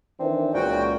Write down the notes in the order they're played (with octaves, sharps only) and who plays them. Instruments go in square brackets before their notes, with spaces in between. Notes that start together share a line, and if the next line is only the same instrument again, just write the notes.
[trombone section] D#3 E3 D4 [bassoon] C4
[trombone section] C#2 [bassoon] A#2 [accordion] F#4 G5